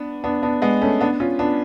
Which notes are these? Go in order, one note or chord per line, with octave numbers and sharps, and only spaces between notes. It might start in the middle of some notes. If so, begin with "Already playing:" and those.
Already playing: B3 D4
B3 D4
B3 D4
G#3 B3
A3 C#4
B3 D4
C#4 F4
B3 D4